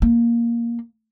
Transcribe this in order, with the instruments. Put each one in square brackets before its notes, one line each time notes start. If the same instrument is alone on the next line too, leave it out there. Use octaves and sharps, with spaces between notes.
[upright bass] A#3